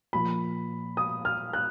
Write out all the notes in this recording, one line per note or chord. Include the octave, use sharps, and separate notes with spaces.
A#2 F3 A#3 B5
D#6
F6
F#6